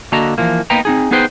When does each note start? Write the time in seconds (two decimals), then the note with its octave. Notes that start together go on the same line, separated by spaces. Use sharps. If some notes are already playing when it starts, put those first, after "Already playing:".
0.12 D3 A#3 F#4 D#5 A5 A#5
0.38 E3 F3 A#3
0.70 A#3 B3 D#4 B4 G5 A#5
0.85 C4 D#4 G#4
1.11 B3 D#4 G#4 B4 C5 G5